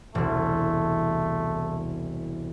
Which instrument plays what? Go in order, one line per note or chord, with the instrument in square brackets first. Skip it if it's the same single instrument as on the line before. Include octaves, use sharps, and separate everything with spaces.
[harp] E1 C2 [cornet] A3